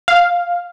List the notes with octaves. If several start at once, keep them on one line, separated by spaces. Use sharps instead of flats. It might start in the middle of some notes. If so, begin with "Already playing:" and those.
F5